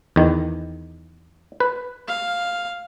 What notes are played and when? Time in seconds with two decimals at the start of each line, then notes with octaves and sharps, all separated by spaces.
0.16 E2 D#3
1.60 B4
2.08 F5